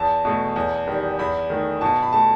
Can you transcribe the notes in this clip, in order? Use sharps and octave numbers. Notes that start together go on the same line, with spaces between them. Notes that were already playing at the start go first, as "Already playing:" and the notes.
Already playing: E2 A5
B2 A3
E2
D#3 G3
E2 B5
D#3 A3
B2 A5
B5
A3 A5